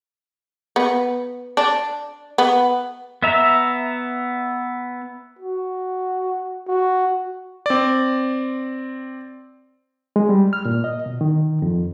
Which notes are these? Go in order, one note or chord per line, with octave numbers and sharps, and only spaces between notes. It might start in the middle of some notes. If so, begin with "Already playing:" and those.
B3
D4
B3
B3 E5 A#5
F#4
F#4
C4 D5
G#3
G3
F6
A#2
D#5
B2
D#3
F2